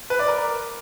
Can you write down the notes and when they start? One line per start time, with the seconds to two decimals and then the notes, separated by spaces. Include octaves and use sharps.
0.10 B4
0.19 D5
0.28 A#4